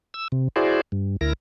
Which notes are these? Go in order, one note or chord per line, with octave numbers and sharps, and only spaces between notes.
E6
C3
E4 F#4 G#4 C5 D5
G2
D2 E4 A#4 A#6